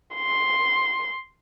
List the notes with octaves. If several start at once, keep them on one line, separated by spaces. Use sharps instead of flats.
C6